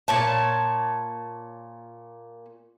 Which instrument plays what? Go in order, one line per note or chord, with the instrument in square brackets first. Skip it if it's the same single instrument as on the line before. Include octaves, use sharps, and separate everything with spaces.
[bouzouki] A#2 C#5 A5